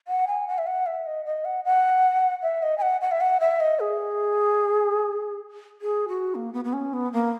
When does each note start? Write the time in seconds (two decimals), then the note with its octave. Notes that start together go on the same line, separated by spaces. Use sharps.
0.08 F#5
0.27 G#5
0.48 F#5
0.58 E5
0.67 F#5
0.86 E5
1.06 D#5
1.25 D#5
1.45 F#5
1.65 F#5
2.43 E5
2.63 D#5
2.78 G#5
2.82 F#5
3.01 F#5
3.11 E5
3.21 F#5
3.40 E5
3.60 D#5
3.80 G#4
5.82 G#4
6.08 F#4
6.35 A#3
6.53 B3
6.64 B3
6.73 C#4
6.93 B3
7.13 A#3